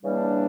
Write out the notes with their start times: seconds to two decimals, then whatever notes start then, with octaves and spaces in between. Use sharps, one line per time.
0.03 C#3 E3 G3 A#3 D4